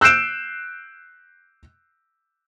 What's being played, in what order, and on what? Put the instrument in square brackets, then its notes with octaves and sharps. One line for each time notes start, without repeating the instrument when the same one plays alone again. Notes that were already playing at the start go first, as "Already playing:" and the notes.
[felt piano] E6 F#6 G6 C7 D7 E7